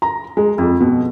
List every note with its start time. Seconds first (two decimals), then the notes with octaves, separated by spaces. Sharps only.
0.02 A#5
0.37 G#3
0.58 F2
0.81 B2